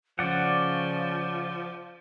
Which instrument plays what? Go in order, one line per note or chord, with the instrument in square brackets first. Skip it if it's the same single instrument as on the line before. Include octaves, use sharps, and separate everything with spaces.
[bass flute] C#3 [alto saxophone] F3 [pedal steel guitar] D5 F#5